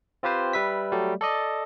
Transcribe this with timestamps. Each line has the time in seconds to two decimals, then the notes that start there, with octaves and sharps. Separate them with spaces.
0.23 C4 F4 G4 B4 C5
0.53 G3 B4 E5 B6
0.92 F#3 G3 A3
1.21 A4 D5 D#5